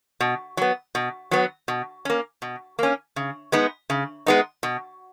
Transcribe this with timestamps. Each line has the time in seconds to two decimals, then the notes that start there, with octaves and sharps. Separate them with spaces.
0.20 B2
0.57 F#3 B3
0.95 B2
1.31 F#3 B3
1.68 B2
2.05 A#3 C#4
2.42 B2
2.79 A#3 C#4
3.16 C#3
3.52 G#3 B3 D#4
3.90 C#3
4.26 G#3 B3 D#4
4.63 B2